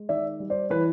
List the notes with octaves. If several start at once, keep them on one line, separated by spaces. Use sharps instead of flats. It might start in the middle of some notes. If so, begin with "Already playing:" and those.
Already playing: G#3
D#3 D5 E5
G3
C5 D5
E3 B4 C#5